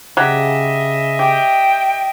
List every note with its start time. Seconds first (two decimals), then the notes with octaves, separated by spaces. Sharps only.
0.17 C#3 F#3 G4 D#5 E5
1.19 G4 G5